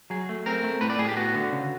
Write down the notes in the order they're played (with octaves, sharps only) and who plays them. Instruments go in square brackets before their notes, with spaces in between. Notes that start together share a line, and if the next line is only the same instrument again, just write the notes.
[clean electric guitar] F#3 G#4
A3
C4 A#4
A3
A2 B4
D5
A2 G#4
G4
B3 F#4
D3
C#3